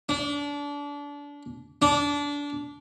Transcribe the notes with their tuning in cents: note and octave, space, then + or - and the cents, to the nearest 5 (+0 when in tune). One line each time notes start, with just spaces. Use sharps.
D4 -30
D4 -25